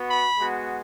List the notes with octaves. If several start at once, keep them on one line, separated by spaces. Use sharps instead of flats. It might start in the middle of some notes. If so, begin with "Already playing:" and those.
Already playing: B3 F#4
B5
G#3 B3 F#4